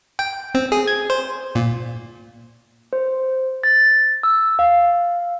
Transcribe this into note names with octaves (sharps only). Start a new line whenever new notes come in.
G5
C4
G#4
G#6
C5
A#2
C5
A6
E6
F5